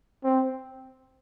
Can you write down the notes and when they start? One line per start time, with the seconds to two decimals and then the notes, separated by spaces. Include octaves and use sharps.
0.24 C4